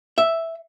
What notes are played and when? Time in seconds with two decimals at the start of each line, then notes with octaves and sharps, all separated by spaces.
0.18 E5